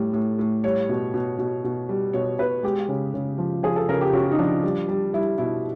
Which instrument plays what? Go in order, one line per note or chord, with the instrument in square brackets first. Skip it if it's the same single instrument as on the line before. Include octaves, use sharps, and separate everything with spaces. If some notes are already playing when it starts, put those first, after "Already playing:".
Already playing: [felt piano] A2 G3
A2
A2
G3 C#5
B2
B2
B2
B2
G3
B2 C#5
B2 B4
G#3 G4
C#3
C#3
F3
F3 G#4
A4
C#3 A#4
G4
C#3 F#4
D#4
F3 D4
G3
G3
G3 E4
B2 E4